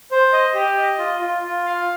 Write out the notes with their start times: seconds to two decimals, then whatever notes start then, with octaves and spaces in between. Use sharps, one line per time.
0.11 C5
0.33 D#5
0.54 G4
0.77 D#5
0.99 F4
1.21 F4
1.43 F4
1.66 F5